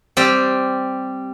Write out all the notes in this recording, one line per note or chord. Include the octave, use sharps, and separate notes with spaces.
G3 C4 G4